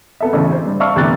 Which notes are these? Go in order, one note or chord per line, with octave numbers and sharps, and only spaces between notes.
B3 A4 E5
A1 D2 C#3
C5
G2
E5 F5 A5 C#6 E6 F6
G1 E2 C3 A3 F#6 A6